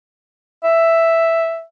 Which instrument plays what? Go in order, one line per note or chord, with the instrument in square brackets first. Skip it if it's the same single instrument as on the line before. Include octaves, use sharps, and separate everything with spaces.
[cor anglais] E5